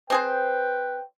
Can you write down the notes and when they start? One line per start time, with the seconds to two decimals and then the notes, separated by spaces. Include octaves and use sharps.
0.10 C4 G#4 B4 C5 G5